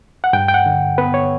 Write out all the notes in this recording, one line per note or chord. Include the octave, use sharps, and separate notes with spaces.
F#5
G2 G5
G5
F#5
D3
B3 B4
C#5